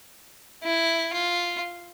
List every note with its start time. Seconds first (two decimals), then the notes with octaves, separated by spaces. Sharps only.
0.64 E4
1.13 F4